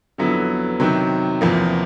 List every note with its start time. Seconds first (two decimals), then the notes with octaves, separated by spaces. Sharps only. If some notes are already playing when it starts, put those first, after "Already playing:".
0.18 F2 D3 F#3 B3 E4
0.80 C3 D#3 F#3
1.41 E2 C3 F3 A#3